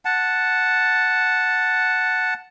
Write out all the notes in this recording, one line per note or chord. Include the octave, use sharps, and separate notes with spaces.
F#5 A5